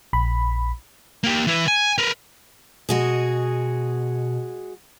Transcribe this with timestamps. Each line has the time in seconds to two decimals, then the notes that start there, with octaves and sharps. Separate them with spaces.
0.13 A#1 B5
1.24 A#3 G4
1.47 E3 B4
1.68 G#5
1.98 A#4 B4
2.89 B2 G#3 F#4 G#4